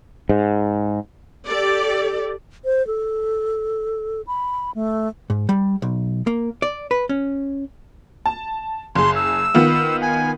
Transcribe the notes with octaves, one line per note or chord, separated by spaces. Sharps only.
G#2
G4 A4 D5
C5
A4
B5
A3
G#2
G3
B1
A#3
D5
B4
C#4
A5
F#1 G#4 C6
E6
D#3 B3 F4
G#5